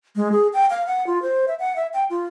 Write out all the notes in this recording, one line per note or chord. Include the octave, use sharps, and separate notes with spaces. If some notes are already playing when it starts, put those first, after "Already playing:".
G#3
G#4
G5
F5
F#5
F4
C5
E5
F#5
E5
G5
F4